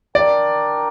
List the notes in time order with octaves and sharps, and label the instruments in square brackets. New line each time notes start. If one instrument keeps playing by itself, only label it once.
[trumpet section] D4 A#4 G5 [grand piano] D5